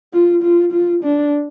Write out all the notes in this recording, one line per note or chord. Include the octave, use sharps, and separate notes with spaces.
F4
F4
F4
D4